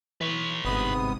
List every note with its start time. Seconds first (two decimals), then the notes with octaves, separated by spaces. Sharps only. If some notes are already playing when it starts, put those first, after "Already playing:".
0.21 E3 B4 C#5
0.65 G1 G#2 C3 B3 D#6